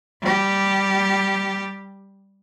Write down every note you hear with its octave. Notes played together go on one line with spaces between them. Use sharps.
G3 G4